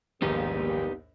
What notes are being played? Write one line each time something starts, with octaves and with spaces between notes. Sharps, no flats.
A#1 D#2 G#2 G3 A#3 B3 D#4 G4